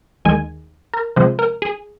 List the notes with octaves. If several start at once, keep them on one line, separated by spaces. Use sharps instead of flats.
D#2 D#3 G#3 G#5
A#4
C3 F3 G#3 C5
A#4
G#4